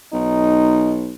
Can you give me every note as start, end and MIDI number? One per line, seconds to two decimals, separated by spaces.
0.13 1.15 35
0.13 0.94 63